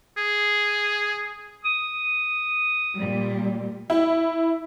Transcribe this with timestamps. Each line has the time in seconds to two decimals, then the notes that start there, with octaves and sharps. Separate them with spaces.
0.17 G#4
1.65 D#6
2.97 A#2 G3
3.90 E4